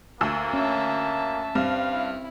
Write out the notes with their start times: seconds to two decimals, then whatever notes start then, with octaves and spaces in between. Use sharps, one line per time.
0.21 D2 A#3 E6
0.54 C#4 E5 A5
1.55 G2 C4 F5
1.92 E4